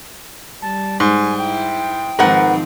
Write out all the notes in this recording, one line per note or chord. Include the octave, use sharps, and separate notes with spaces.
G3 A5
G#2 G#5
E4 G5
G#2 D#3 F3 C4 A#4 B4 F#5